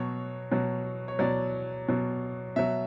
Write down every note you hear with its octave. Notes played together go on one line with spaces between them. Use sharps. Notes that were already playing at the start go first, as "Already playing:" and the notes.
Already playing: B2 F#3 C#5
B2 F#3
C#5
B2 F#3 D5
B2 F#3
B2 F#3 E5